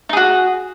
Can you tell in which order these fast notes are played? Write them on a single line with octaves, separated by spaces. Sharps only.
D#4 G#4 F#4